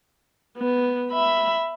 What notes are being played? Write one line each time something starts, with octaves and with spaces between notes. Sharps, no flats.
B3
E5 B5